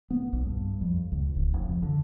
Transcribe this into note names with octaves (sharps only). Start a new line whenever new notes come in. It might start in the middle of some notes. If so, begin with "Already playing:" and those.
B3
B1
G2
F2
C#2
D1
F1
F2
D3